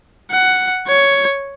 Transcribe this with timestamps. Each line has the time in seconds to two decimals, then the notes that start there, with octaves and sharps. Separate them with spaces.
0.31 F#5
0.87 C#5